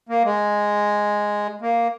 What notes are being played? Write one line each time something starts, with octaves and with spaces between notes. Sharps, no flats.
A#3
G#3
A#3